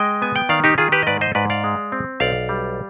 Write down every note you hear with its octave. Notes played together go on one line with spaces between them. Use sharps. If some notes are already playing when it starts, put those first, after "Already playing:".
Already playing: G#3 D#5 G5
B3 G#5
G5
D#3 D5 F5
D#4 G4
D#3 F4 G#4
G4 B4
D#5
G#2 B4 D5
C5 D#5
G#2 B4 D5
D5 F5
G#3
C4
B1 D5 F5
G3